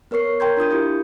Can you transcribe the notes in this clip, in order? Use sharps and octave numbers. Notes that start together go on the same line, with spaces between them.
B3 A#4 C#5 C#6 C7
A#4 G5 A#5 C6 G6 G#6
D4 F4 D#6 G6
E4 F4 G4